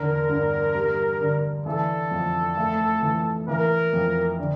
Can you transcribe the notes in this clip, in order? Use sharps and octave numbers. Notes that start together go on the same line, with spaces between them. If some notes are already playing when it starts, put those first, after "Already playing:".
Already playing: E2 D3 A#4
G2
G3
D3
E3 A4
F2
A3
E3
E3 A#4
F2
D3